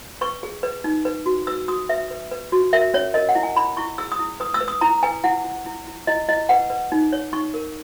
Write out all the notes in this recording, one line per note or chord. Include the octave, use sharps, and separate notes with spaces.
B4 C#6
G#4
B4
D#4
B4
F#4
B4 E6
F#4 D#6
B4 E5
B4
B4
F#4
A#4 E5
C#4 C#5
A#4 D#5
F#5
E4
G#5
E4 B5
E4 C#6
G#4 E6
D#6
E4
B4 D#6
E6
B4
D#6
E4 A#5
B4 G#5
E4 F#5
E4
E4
E4
E4 D#5
E4 D#5
B4 F#5
B4
D#4
C#5
D#4 C#6
A#4